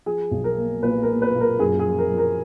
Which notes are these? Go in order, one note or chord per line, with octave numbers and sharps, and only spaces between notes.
F3 G#4
B1
A#4
A#3
A#2 B4
A#4
A#3
B4
A#2
A#4
F#2 G#4
G#4
F3
A#4
F3
A#4